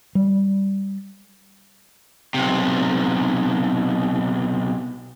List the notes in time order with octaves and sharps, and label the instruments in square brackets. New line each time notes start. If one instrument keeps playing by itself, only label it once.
[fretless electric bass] G3
[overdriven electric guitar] B1 C3